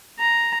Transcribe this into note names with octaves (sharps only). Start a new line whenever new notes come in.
A#5